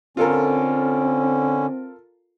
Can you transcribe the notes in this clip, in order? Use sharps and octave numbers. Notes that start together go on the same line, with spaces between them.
D3 C4 C#4 F4 A4 A#4